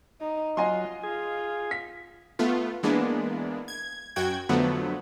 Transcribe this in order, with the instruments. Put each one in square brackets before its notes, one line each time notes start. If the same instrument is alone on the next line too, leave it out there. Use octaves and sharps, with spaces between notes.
[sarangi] D#4
[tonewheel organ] F#3 [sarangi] F4 [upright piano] D#5 G#5 C6
[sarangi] F4 [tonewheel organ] G#4
[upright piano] B6
[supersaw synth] A3 B3 F4
E3 G#3 A#3 B3 D4
G#6
F#2 F#4 G5 G#6
F2 D3 F3 F#3 A3 B3